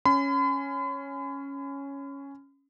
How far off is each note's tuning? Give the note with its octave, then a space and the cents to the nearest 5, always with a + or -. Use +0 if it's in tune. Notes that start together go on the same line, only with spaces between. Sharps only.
C#4 +0 B5 +45